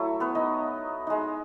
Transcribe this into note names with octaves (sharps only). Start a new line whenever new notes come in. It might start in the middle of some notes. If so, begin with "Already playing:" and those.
Already playing: F#3 A3 E4 A4
B3 B4
D#4 D#5
G#3 D#4